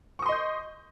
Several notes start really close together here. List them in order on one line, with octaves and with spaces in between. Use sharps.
C#6 D#6 C6 D#5 G6